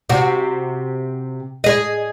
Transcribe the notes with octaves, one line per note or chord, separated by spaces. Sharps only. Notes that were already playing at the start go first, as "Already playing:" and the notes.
C3 F#4
G#4 D#5